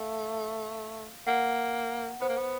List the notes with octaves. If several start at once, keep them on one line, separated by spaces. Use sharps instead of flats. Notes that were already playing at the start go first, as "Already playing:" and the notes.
Already playing: A3 F5
A#3 F#5
B3 C5
A#3
B3